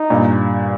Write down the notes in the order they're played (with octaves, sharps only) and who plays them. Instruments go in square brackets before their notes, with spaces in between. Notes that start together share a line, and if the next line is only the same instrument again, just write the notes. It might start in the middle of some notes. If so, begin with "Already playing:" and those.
Already playing: [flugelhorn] D#4
[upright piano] G2 A#2